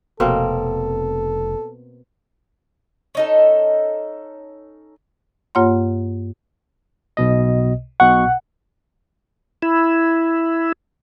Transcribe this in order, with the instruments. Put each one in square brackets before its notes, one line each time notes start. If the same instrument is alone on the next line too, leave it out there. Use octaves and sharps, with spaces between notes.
[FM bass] F1 [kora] B2 A#3 C4 [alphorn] A4
[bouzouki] C#4 D#4 A4
[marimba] G2 A#3 F4 C#5 F#5 C6
[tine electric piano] B1 B2 D#5
[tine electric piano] B1 B2 C#6 [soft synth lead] F#5
[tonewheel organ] E4